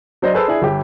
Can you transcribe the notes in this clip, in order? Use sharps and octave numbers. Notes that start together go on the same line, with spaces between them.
F#3 D4 C5 D5 D#5
G#4 A4 B4 C5 A5 E6
D4 E4 G#4
G1 G4